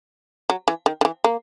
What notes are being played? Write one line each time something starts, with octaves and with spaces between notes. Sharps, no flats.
F#3
E3
D#3
D#3
E3
A#3